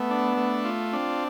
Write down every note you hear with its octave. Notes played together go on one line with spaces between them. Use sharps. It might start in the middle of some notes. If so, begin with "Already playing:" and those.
Already playing: A3 B3
D4
A3
F4
C4 D4